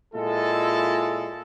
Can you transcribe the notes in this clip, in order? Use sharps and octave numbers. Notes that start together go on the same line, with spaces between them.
A#2 G#3 E4 F4 A4